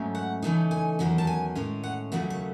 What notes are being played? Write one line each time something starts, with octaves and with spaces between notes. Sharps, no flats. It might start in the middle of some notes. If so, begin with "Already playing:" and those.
Already playing: G#2 F#3 A3 C#4
F#5
C#3 E3 A3 D#4
G#5
E2 D#3 F#3 C#4
A5
G#5
A2 G#3 C#4
F#5
D#2 C#3 F#3 A3 F#5
C#5